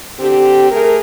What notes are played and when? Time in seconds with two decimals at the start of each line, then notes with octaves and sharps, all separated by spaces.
0.19 D3 C4 G4
0.71 A3 G#4 A#4